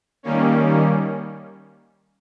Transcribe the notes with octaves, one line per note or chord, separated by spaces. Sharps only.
D#3 G3 A#3 C#4